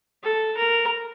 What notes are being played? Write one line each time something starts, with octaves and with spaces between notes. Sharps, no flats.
A4
A#4